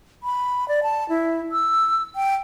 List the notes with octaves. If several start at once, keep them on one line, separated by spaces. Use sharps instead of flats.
B5
D5
A5
E4
E6
G5